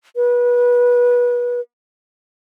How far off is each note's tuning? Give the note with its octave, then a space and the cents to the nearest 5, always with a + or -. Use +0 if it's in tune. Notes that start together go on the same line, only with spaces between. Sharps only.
B4 -25